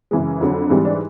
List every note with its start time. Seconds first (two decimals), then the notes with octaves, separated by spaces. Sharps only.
0.11 F#2 C#3 E3 G#3
0.41 F2 D3 F#3
0.70 G#2 E3 G3 C4
0.85 D4